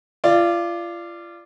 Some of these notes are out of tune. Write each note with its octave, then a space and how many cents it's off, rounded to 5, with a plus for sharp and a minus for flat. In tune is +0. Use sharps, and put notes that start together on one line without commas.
F4 -30 D5 +5